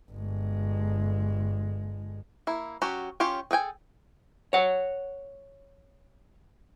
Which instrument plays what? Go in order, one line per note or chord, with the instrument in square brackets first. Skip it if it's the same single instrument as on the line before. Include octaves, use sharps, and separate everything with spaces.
[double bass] G1 G#3
[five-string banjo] A#3 E4
F#3 C#4 F#4 G4
C#4 F4 G4 C#5 G5
G#4 A4 G5 G#5
[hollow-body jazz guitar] C#5 F#5